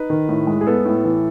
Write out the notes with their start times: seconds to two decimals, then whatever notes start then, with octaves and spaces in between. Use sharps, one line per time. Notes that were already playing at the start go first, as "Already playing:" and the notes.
Already playing: D#4 B4
0.10 D#3
0.29 A2
0.47 G#3
0.61 G#4
0.67 B3 A4
0.85 A2
1.05 E3